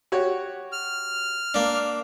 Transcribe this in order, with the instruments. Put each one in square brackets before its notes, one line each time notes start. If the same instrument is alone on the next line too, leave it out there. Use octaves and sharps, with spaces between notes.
[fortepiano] F#4 G4 C#5
[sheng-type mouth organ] F6
[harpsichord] A#3 D4